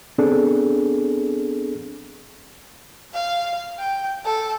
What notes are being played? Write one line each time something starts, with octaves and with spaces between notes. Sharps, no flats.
B3 C4 D4 G#4 A4
F5
G5
A4